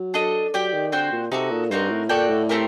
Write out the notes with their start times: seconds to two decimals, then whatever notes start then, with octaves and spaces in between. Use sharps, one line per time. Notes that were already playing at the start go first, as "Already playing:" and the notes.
Already playing: F#3
0.14 D4 A4 D#5
0.54 F#3 G4 D5 G5
0.73 D#3
0.92 D3 C4 F#4 C5 G5
1.12 A#2
1.31 C3 D#4 F#4 A4
1.51 A#2
1.70 G2 C4 D#4 F#4 A#4
1.91 A2
2.09 A#2 F#4 A4 D5 G5
2.29 A2
2.49 A3 C4 G4 A#4